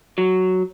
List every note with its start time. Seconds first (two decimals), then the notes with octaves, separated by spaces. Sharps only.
0.18 F#3